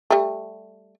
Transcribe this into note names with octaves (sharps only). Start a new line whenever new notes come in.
G3 A3